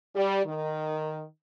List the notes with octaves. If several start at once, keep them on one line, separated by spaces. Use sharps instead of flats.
G3
D#3